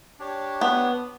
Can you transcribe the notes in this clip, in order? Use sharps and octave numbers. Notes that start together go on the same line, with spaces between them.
D4 G4 C#5
B3